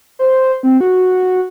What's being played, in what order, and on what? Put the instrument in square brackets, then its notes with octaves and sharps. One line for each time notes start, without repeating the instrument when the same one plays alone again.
[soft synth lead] C5
C4
F#4